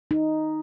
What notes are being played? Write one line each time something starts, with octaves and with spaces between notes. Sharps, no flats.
D#4